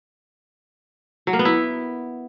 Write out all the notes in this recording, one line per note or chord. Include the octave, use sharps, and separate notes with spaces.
F#3
A#3
B3
E4